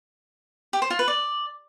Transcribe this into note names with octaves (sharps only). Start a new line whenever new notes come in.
G4
C5
F4
B4
D5